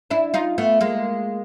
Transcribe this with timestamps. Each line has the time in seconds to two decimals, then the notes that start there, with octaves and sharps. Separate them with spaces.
0.10 D4 E4
0.34 D#4 F4
0.58 A3 B3
0.81 G#3 A#3